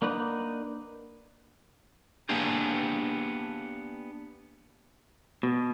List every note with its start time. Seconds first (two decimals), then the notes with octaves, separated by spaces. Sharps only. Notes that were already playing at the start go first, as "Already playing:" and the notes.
0.02 A#3 D4 D#4 B4 F#5
2.29 A#3 B3 D4 G4 G#4
5.43 B2